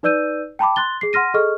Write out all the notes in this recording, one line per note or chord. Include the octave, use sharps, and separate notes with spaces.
D#4 B4 D5 E6 G6 D#7
G5 A5 B5 D6
C6 F#6 A6 G7
G#4 C7
F#5 C6 F6 A#6 D#7
G#4 A4 D#5 C#6 F6